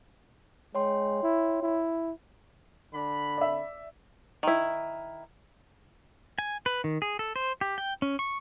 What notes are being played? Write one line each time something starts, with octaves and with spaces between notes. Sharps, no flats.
G#3 C#5 G5 C6
E4
E4
D3 D4 B5
D5 E5
D#3 E4
G#5
B4
D#3
G#4
A4
C5
G4
G5
C#4
C#6